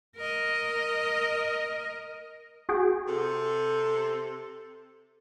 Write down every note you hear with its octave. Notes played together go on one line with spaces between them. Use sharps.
A#4 D#5
F#4 G#4 G5
C3 A4